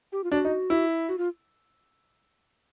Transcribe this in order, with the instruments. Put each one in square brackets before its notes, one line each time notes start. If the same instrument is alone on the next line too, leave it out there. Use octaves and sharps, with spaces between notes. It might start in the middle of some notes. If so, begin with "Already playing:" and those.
[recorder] G4
F4
[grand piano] D4 [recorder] F#4
[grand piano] D#4
E4
[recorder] F#4
F4